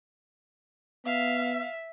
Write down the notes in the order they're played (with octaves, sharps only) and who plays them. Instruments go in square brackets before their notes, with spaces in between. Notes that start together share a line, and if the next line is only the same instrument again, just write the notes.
[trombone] B3 [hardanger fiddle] E5 [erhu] F5